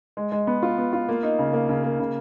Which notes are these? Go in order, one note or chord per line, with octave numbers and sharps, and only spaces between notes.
G#3
G#3
B3
F4
B3
F4
A#3
D#4
C#3
A#3
C#3
A#3
C#3